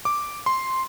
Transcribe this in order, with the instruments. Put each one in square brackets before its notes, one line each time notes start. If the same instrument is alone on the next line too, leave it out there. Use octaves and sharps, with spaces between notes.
[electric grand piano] D6
C6